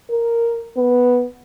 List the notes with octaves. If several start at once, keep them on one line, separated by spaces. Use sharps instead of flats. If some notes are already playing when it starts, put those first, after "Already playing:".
A#4
B3